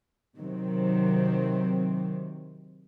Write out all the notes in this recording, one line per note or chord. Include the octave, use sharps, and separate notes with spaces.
C3 D#3 F#3 C4